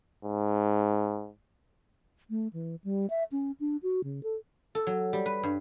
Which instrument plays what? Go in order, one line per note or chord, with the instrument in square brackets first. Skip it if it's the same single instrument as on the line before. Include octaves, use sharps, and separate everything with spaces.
[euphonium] G#2
[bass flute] A3
E3
G3
E5
C#4
D4
F#4
C#3
A4
[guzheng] A4
F#3
G3
B4
G2